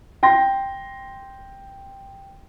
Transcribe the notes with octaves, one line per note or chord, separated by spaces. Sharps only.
G5 C6 A#6